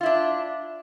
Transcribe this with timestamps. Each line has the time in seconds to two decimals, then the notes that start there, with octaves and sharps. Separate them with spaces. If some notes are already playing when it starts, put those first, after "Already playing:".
0.01 F4
0.03 E4
0.06 D4